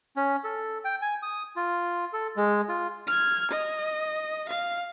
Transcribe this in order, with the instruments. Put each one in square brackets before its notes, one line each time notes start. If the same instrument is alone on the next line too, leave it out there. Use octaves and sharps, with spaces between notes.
[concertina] C#4
A4
G5
G#5
D#6
F4
A4
G#3
F4
[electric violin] F6 G#6
D#5
F5